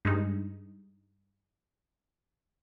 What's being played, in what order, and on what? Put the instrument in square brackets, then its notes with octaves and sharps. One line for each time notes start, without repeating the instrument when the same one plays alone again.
[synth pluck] G2 G#3 D#4